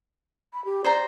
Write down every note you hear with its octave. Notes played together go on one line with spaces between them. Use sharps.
B5
G4
C5 D5 G5 A#5